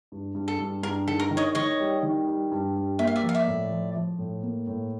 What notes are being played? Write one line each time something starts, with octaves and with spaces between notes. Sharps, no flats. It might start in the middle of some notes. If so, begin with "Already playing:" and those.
G2
G2
A4
G2
G2 A#4
D#3 A4
A#4
D#3
C#5 D#5
D#3 C#5 D#5
G3
D#3
G3
G2
G3
A#3 E5
F5
D5 E5
F3
F5
D5 E5
A2
F3
F3
A2
A#3
A2